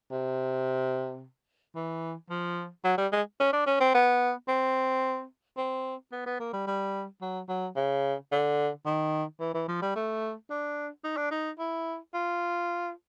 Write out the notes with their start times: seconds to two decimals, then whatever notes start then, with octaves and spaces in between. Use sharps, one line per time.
0.11 C3
1.76 E3
2.30 F3
2.84 F#3
2.97 G3
3.12 G#3
3.40 C#4
3.53 D4
3.66 C#4
3.80 C4
3.94 B3
4.48 C4
5.57 C4
6.12 B3
6.26 B3
6.40 A#3
6.53 G3
6.67 G3
7.21 F#3
7.48 F#3
7.76 C#3
8.31 D3
8.85 D#3
9.40 E3
9.54 E3
9.68 F3
9.82 G3
9.95 A3
10.50 D4
11.04 D#4
11.17 D4
11.31 D#4
11.59 E4
12.14 F4